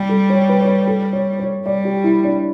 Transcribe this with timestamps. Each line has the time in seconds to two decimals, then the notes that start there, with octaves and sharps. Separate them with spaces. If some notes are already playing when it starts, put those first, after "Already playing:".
Already playing: G3 G5
0.09 A4
0.30 C#5
0.49 B4
0.61 C#5
0.69 B4
0.87 A4
1.13 C#5
1.39 C#5
1.65 G3 D5
1.85 G4
2.04 E4
2.24 D4